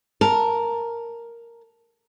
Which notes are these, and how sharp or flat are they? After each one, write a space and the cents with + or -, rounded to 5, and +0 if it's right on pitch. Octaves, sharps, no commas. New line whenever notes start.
A#4 +0 A5 +0